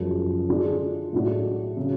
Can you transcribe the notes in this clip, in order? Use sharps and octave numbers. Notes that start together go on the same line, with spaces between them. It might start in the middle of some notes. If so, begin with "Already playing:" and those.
Already playing: F#1 F#2 F3 G#3
D3 G#3 D4 F4 G#4
B1 A2 G#3 D4 F#4
C#3 F#3